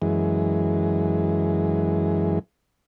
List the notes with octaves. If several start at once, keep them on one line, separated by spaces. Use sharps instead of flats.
F#2 E3 G#3